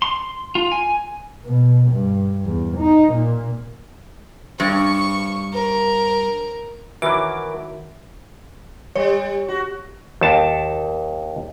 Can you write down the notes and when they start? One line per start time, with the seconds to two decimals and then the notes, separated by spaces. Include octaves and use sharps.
0.02 C6
0.55 F4
0.72 G#5
1.44 B2
1.91 G2
2.45 E2
2.77 D#4
3.13 A#2
4.60 G2 C#6
5.53 A#4
7.02 D#3 E3 F#3 F#4 A#4 E5 D6
8.96 G3 C#5
9.48 F#4
10.21 D#2 A5